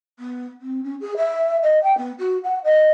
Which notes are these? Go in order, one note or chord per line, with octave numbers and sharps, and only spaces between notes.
B3
C4
C#4
G#4
E5
D#5
G5
B3
F#4
F#5
D#5